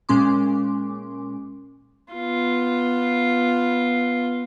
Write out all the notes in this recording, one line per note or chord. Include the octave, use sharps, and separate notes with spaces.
A#2 G#3 C#4 C6 D6
B3 F4